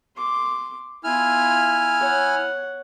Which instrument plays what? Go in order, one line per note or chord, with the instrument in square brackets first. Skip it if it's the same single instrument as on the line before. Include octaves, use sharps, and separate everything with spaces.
[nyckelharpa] C6 D6
[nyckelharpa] B3 F4 [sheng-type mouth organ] E4 G#5 F6
[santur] C#5 [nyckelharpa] F#5